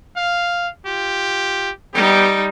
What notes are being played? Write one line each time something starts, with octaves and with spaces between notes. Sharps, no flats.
F5
F4 G4
G3 B3 D#4 G4